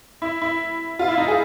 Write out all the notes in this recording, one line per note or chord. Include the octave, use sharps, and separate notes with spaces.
E4
E4
F4
E4
D#4
G#4